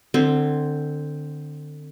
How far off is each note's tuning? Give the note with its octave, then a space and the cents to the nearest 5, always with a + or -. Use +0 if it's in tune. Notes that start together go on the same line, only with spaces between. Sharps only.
D3 +25 C4 +0